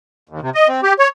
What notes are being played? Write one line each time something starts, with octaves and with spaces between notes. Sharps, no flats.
D#2
C3
D#5
C4
G4
C#5